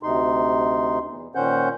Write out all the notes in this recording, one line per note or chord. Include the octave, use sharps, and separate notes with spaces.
D2 C3 D#4 C6
E2
A#2 D#3 C#4 C5 F#5 G6